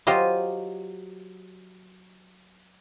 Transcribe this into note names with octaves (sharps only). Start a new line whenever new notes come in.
F#3 F4 G4 C5 D#5